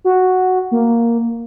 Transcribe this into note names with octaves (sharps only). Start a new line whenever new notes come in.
F#4
A#3